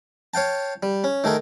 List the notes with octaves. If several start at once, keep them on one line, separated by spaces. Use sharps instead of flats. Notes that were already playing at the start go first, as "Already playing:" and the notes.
C#5 F5 G5 A5
G3
C#4
D#3 A3 G#4 A#4